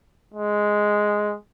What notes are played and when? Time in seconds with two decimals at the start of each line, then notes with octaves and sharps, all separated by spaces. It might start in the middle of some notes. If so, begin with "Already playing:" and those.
0.34 G#3